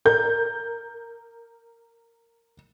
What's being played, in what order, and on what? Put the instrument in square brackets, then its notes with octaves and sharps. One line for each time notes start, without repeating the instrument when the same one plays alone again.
[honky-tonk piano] A#4 G6